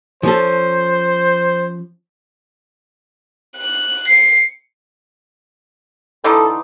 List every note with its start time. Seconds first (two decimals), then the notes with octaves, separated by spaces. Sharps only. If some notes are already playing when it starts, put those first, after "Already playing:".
0.23 F3 C#4 A4 C5
3.57 F#6
4.08 C7 C#7
6.24 D3 E3 D#4 A4 C6 D6